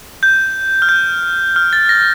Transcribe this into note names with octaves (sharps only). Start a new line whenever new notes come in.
G6
F6
G6
F6
A6
A#6